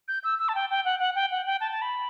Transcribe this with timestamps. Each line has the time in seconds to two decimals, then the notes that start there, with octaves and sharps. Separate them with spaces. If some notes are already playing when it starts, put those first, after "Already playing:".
0.08 G6
0.24 E6
0.39 E6
0.49 A5
0.55 G5
0.70 G5
0.85 F#5
1.00 F#5
1.15 G5
1.31 F#5
1.46 G5
1.61 A5
1.72 A5
1.82 B5